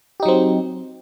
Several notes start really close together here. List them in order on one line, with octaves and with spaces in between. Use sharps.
G4 D#4 F#3 C4